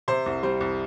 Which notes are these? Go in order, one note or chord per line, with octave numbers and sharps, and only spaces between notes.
C3 C5
C2
G3 C5
C2